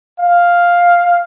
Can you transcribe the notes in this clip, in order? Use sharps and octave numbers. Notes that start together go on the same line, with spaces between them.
F5